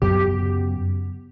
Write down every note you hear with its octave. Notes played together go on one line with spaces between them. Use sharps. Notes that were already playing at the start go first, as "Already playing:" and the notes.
F#2 C#3 F#3 B3 G4